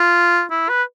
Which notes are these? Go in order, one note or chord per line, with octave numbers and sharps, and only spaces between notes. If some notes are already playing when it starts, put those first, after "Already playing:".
Already playing: F4
E4
B4